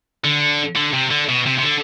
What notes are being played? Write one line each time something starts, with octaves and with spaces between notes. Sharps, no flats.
D3
D3
C3
D3
B2
C3
C3
D3